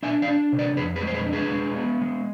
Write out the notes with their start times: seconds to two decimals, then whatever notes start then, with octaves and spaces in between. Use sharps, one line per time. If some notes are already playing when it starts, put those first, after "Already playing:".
0.03 D4 E5 G#5
0.22 D5 F5
0.28 D4
0.52 C3
0.59 B4 D5
0.77 F2 G#4 B4
0.96 G#4 B4
1.02 G#3
1.07 C5
1.14 G#4 B4
1.26 D4
1.33 G#4 B4
1.52 G#3
1.77 B3
2.01 G#3